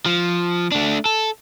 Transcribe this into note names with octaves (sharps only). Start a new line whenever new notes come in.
F3
A3 D4
A4